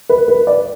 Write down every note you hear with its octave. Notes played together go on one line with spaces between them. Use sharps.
B4
B4
D5